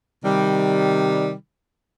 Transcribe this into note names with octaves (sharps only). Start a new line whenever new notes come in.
C3 D#3 G3